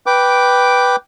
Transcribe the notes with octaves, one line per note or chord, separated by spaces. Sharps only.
B4 G5 D6